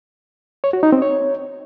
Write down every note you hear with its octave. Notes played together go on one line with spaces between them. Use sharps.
C#5
F#4
D#4
C4
C#5